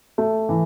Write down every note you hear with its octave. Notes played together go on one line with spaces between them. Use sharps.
A3
E3